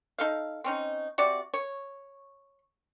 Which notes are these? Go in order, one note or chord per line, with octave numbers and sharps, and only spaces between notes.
D#4 A4 F5
C4 C#4 D#4
C3 F#4 D5
C#5